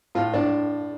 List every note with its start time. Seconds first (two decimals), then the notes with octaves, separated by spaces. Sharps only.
0.15 A2 F4
0.33 A2 D4